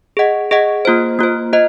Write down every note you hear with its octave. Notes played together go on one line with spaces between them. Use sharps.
G#4 D#5 F#5
G#4 D#5 F#5
A#3 F4 C5
A#3 F4 C5
F4 C5 D#5